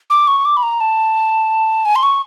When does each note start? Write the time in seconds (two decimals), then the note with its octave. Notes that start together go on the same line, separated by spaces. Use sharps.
0.10 D6
0.27 C#6
0.45 D6
0.57 B5
0.63 A#5
0.81 A5
1.85 G#5
1.96 C6
2.03 C#6